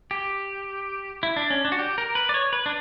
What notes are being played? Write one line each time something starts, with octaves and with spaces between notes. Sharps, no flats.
G4
E4
D4
C#4
D4
F#4
G4
A#4
B4
D5
C#5
B4
D4